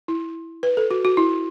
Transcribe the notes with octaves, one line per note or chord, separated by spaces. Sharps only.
E4
B4
A4
F#4
F#4
E4